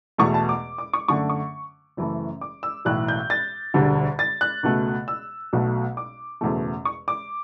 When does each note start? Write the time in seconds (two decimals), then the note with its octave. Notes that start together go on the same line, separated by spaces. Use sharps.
0.18 E2 B2 A3 C#6
0.34 A5
0.49 D6
0.78 D6
0.93 C#6
1.08 F#2 D3 A3 C#6
1.29 C#6
1.97 F#1 F#2 E3 A3
2.41 D6
2.63 E6
2.85 B1 A2 E3 F#6
3.08 G6
3.30 A6
3.74 E1 D2 D3 G3
4.19 A6
4.41 F#6
4.63 C#2 B2 A3
5.08 E6
5.53 B1 B2 F#3 A3
5.97 D6
6.41 F#1 E2 B2 A3
6.85 C#6
7.08 D6